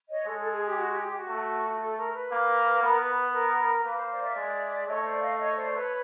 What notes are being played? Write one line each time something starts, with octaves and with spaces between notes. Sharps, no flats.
C#5 D#5
G#3 A4
A4
G#4
G4
F#4
G4
G4
F#4
A3
A4
A#4
B4
A#3
B3 A#4
B4
B4
A#4
A#3 B4
C5
C5 D5
D5 E5
G#3
A3 C#5 D#5
C5 D5
D#5 F5
C#5 D#5
C5 D5
B4 C#5